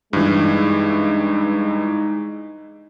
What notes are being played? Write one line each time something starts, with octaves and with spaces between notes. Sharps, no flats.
G2 E3 G#3 D#4